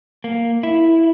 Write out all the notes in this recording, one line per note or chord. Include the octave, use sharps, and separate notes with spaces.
A#3
E4